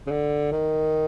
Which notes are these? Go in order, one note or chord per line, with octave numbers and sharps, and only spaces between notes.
C#3
D3
D#3